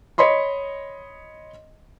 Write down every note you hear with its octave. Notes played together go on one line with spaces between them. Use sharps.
C#5 D#5 B5 C6